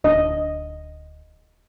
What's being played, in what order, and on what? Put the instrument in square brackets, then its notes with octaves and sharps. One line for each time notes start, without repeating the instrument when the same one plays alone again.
[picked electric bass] D1 D4 [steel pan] D#5